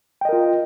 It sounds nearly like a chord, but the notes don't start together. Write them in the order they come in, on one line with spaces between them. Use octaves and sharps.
G5 D#5 A#4 F4